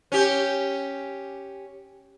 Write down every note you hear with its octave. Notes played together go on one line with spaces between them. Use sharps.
C#4 G4